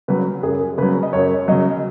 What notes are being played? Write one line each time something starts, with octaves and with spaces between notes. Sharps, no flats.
C#3 F#3 B4
F#2 G#4
C#3 F#3 B4
D#5
F#2 C#5
C#3 F#3 D#5